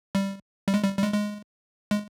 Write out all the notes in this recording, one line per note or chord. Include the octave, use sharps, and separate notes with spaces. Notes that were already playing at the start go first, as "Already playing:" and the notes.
G3
G3
G#3
G3
G3
G#3
G#3
G#3